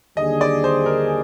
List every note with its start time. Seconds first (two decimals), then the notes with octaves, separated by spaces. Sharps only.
0.17 D#2 D3 G3 D4 G#4 D#5
0.41 D5
0.64 C5
0.86 A#4